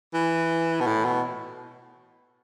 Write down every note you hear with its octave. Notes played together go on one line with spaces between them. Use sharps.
E3
B2
A2
B2